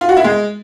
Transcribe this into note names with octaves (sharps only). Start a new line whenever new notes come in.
F4
F#4
E4
G#3